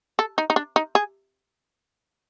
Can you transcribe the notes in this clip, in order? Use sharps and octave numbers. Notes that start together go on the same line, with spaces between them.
A4
D#4
D#4
D4
D#4
G#4